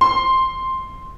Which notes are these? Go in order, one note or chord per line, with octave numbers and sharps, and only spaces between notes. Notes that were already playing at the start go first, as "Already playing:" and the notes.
C6